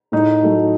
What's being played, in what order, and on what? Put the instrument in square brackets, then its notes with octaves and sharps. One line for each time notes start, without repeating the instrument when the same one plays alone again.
[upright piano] A2 D#4
F#3 A3